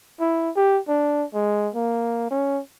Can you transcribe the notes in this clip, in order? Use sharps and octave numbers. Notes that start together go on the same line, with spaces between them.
E4
G4
D4
G#3
A#3
C#4